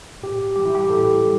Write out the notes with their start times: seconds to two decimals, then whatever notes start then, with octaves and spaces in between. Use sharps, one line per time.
0.22 A2 G4
0.56 E3 G3 G4
0.65 E4
0.75 G4
0.89 A2 A4
1.23 G3